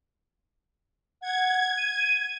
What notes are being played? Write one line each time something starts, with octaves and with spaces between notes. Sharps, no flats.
F#5 G#6
D#7